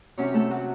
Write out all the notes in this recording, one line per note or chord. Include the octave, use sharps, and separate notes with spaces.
C3 F#3 C#4 C#5
A3 A4
F#3 F#4